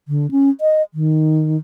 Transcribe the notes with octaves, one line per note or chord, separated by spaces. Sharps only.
D3
C#4
D#5
D#3